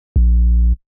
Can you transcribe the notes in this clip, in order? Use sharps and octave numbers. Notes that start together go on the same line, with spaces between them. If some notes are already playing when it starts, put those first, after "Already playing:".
A#1